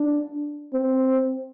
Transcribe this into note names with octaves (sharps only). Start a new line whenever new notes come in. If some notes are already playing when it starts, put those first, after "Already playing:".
Already playing: D4
C4